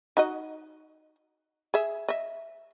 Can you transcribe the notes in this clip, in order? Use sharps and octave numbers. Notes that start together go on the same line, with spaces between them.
D#4 F#4 D#5
G#4 E5
D#5 E5